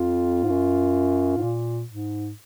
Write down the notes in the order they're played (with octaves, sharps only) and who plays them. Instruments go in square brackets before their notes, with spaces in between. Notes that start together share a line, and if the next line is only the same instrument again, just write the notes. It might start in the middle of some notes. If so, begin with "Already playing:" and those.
Already playing: [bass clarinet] F2 [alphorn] F4
[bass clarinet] G#2
F#2
G#2
A#2
G#2